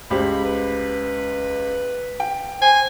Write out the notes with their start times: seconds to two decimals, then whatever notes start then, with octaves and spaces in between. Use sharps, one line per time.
0.10 C#2 G4 C5 B5
0.45 B4
2.20 G5
2.62 C5 G#5